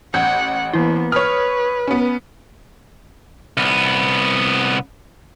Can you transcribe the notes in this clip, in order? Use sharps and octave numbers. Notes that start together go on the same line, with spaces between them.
A1 F#5 G6 G#6
E3 A#3 B3 E4
B4 C#5 D#6 F6
B3 C#4
C2 B3